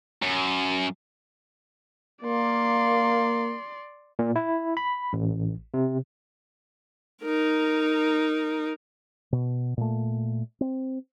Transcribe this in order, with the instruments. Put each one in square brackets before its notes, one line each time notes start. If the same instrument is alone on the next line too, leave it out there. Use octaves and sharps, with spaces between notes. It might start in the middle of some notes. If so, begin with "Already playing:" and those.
[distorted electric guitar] F#2
[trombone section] A#3 [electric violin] D5 C6
[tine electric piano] A#2
E4
B5
A1
C3
[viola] D#4 A#4
[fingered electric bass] B2
A#2 A3
C4